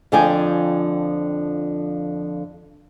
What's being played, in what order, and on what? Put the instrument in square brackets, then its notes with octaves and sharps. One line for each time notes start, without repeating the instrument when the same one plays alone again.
[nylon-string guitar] F2 D3 F3 G5 G#5